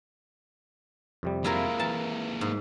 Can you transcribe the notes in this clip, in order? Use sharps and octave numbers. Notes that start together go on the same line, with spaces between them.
F2 C3 G3
G#3 A#3 E4 F4 A#4
E3 A#4 A5
G#2